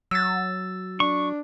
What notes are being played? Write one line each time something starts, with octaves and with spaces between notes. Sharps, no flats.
F#3 E6 A6
D4 C#6